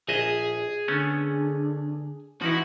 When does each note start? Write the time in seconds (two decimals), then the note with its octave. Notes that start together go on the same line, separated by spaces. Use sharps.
0.09 A#1 G#4 D#5 E5
0.88 D3 A3 B3 C#4
2.42 E3 F3 D#4 E4 F#4